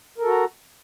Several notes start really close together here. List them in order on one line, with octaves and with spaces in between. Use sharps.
A#4 A4 F#4 A#5